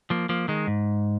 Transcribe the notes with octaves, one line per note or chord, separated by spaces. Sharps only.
F3 A#3
F3 A#3
D#3 G#3
G#2